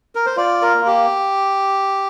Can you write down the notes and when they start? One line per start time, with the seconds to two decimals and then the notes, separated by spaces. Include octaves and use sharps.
0.15 A#4
0.26 C5
0.37 F4 D5
0.62 A#4
0.74 A#3
0.86 G4